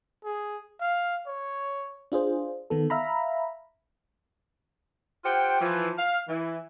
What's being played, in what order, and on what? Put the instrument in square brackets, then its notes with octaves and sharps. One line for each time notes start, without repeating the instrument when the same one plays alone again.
[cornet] G#4
F5
C#5
[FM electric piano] D4 F4 G#4 C5
D#3 B3 A4
E5 F5 A#5 B5
[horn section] F4 G4 C5 F#5 G5
E3 F3
F5
E3